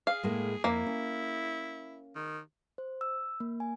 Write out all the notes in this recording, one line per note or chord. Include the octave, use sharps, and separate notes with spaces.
G#4 F5
A2 G#3 A#3
F2 A#3 E4
C#4
D#3
C5
E6
A#3
G#5